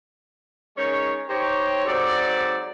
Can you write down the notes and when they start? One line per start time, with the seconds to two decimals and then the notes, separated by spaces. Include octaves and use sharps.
0.77 D#3 G#3 C#4 C#5
1.29 D#4 G4 C5 C#5
1.86 G#2 F#3 C4 A4 D5